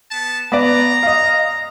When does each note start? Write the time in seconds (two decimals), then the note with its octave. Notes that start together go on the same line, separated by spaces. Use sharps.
0.10 B3 A5
0.52 B3 D5 A#5
1.03 D#5 F5